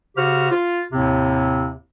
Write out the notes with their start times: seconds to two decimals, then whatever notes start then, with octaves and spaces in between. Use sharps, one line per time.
0.16 C#3 F#4 G4 C5 F6
0.51 F4
0.92 D#2 A2 C3 C4